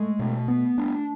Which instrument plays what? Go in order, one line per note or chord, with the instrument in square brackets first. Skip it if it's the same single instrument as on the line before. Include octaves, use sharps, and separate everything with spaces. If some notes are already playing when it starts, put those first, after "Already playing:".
Already playing: [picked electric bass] G#3 [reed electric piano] A3
[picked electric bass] B2
B3
D4